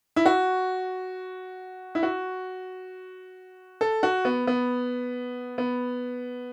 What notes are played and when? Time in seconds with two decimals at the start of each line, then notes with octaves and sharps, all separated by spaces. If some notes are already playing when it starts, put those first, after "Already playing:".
0.16 E4
0.26 F#4
1.95 E4
2.03 F#4
3.81 A4
4.03 F#4
4.25 B3
4.47 B3
5.58 B3